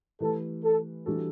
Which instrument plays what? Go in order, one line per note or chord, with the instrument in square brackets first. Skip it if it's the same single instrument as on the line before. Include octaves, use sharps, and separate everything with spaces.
[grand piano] E3 A3 E4 G4 B4 [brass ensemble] A4
[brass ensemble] A4
[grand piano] E3 G3 D4 F#4 A4